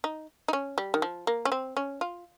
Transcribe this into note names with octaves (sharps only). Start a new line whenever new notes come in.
D#4
D#4
C#4
G3
D#3
F3
A#3
C#4
C4
C#4
F4